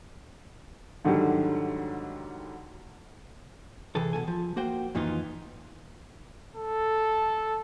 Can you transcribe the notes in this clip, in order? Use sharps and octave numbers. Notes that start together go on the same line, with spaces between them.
G#2 D3 D#3 F#3 G3
C3 E3 G#4 A4
B2 G3 A4 G#5
F3
A#3 F#4 C5 G5
F2 A#2 D#3 E3 D#4 F4
A4